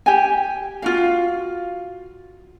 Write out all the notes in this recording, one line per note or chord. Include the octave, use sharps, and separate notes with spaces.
G4 G#5
F4 F#4 F5